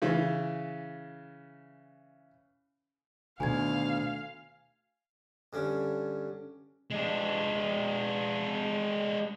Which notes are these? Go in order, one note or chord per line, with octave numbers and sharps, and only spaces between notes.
C#3 E3
D2 B2 D#3 F5 G#5 G#6
G2 D3 C#4
G#3 D4